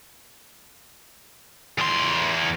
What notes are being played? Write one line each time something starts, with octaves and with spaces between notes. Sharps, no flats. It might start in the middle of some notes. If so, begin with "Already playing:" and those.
E2 C6